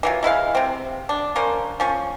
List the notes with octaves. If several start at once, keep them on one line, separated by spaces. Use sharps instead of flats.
E3 F#3 F4
G#3 E4 B4 F5
C3 C4
D4
A#3 C#4 C5
F3 C#4 C#6